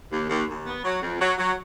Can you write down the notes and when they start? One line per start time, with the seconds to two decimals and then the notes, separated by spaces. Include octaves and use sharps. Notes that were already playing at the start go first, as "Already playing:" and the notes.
0.12 D#2
0.30 D#2
0.47 D#2
0.66 B3
0.84 F#3
1.02 F2
1.19 F#3
1.37 F#3